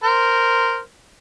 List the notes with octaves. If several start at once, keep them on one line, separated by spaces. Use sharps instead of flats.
A#4 C5